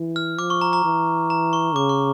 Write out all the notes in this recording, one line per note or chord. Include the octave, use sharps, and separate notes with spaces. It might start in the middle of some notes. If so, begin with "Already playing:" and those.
Already playing: E3
F6
F3 D6
C#6
A#5
A#5
E3
A#5
C#6
C#3 D6
C#6